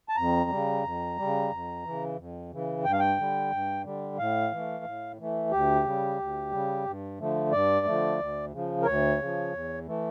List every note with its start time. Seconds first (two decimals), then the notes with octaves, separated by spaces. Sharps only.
0.09 A5
0.16 F2 A#5
0.50 C#3 G3
0.84 F2
1.18 C#3 G3
1.51 F2
1.84 C#3 E3
2.18 F2
2.52 C#3 E3
2.84 G2 G5
2.92 F5
3.00 G5
3.18 D3 G3
3.51 G2
3.84 D3 G3
4.19 A2 F5
4.52 E3 A3
4.84 A2
5.19 E3 A3
5.51 D2 G4
5.85 C#3 G3
6.19 D2
6.52 C#3 G3
6.85 G2
7.20 D3 F3 A3
7.52 G2 D5
7.86 D3 F3 A3
8.19 D2
8.53 C#3 F3
8.82 A#4
8.86 D2 C#5
9.19 C#3 F3
9.53 E2
9.86 E3 A3